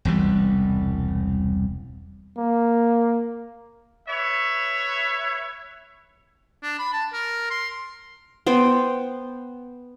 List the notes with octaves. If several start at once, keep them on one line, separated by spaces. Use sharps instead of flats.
E1 C2 E3 G3
A#3
B4 C#5 E5
D4
B5
A5
A#4
C6
B3 C5 G5